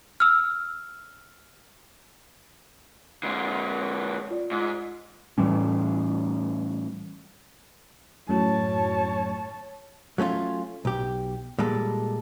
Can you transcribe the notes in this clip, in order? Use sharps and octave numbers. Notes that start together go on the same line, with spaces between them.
E6 F6
D3 G#3
F4 D5
G#2
A2 E3 G3 C#4
F#2 A2 F#3 C#5 A5
F#3 A3 C#4 F4
B1 G4
A#2 G3 G#3 A4